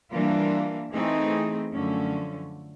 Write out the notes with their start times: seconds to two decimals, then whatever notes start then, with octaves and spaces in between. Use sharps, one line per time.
0.12 E3 G3 A#3 D4 F4
0.92 E3 A3 C4 D#4 G#4
1.71 F#2 D3 F3 A3 C#4